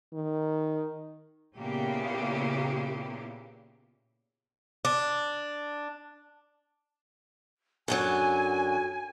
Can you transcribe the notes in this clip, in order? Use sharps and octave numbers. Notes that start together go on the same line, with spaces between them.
D#3
A#2 C#3 A#3 B3 E4 G4
D4
F#2 D3 F#3 G#5